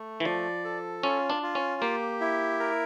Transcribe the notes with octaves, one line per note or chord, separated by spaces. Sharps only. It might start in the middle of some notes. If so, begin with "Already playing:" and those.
Already playing: A3
E3
F3 D5
A4
C#4 F4
D4
F4
C#4
A#3 G4
E4
A#4